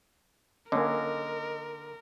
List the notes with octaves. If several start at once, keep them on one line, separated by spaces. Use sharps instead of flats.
D3 A#3 C#4 A#4 D#5